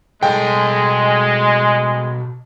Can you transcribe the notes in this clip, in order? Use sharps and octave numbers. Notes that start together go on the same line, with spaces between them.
B2 G#3 A4 G5